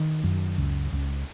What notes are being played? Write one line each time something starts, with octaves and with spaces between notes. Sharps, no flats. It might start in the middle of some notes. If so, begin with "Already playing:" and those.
Already playing: D#3
F#2
C#2
C#2